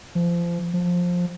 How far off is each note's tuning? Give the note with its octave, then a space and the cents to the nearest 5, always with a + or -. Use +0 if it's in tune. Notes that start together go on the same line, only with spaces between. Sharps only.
F3 -25
F3 +15